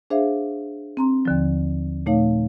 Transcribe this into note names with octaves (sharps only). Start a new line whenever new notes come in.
D4 G#4 C5 E5 F5
C4 A#5 C6
D#2 D3 F3
A#2 A3 D#4 C#5 F5